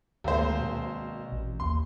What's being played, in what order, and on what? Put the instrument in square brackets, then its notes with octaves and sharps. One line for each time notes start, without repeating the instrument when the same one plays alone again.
[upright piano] G#1 A#3 C5 [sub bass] D2
[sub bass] B2
A1
[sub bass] D#2 [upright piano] C6